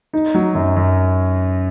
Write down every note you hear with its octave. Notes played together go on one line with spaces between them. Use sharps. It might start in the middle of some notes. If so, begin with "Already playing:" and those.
D#4
F#3
F#2
F#2